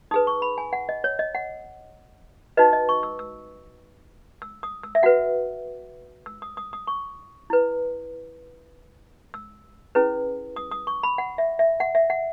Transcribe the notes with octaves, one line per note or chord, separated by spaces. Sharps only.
D#4 G#4 B4 D#6
C#6
B5
G#5
F#5
D#5
C#5
D#5
F#5
D#4 F#4 B4 D#5
D#5
C#6
E6
E6
E6
D#6
E6
E5
F#4 B4 F#5
E6
D#6
D#6
D#6
C#6
E4 B4
E6
C#4 E4 G#4 B4
D#6
D#6
C#6
B5
F#5
E5
E5
F#5
E5
F#5